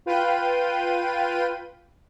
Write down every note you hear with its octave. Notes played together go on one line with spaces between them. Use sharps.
F4 B4 F5 G5 D#7